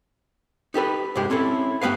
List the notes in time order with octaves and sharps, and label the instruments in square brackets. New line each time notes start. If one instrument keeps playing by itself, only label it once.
[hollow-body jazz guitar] D#4 G4 A4 B4
C2 G2 G3 G#3 G4
C4 C#4 E4 A4
G2 G3 B3 B4 F5